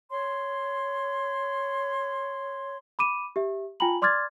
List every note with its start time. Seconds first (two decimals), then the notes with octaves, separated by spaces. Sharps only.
0.10 C#5 C6
2.99 B5 D6 D#7 E7
3.36 G4 E5
3.80 F4 G5 G#5 A#5 B5 F#7
4.02 D5 C6 D6 F6 G#6 A6